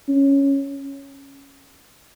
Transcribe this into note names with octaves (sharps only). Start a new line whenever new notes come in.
C#4